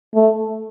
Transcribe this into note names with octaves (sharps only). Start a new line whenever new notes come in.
A3